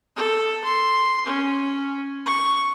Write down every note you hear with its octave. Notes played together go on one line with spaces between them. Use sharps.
A4
C6
C#4
C#6